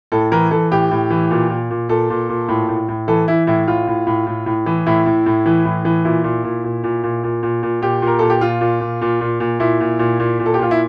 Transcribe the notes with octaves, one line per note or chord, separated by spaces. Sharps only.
A2 A4
E3 A#4
E3 A4
A2 G4
A2
E3
A#2
A#2
A#2
A#2 A4
A#2
A#2
A2
A2
A2
E3 A4
E3 E4
A2 E4
A2 F4
A2
A2
A2
A2
E3
A2 E4
A2
A2
E3
A2
E3
A#2 E4
A#2
A#2
A#2
A#2
A#2
A#2
A#2
A#2
A#2 G4
A#2
A#4
A#2 A4
G4
A#2 F4
A#2
A#2
A#2
A#2
A#2
A#2 E4
A#2
A#2
A#2
A#2
A4
G4
A#2 F4
E4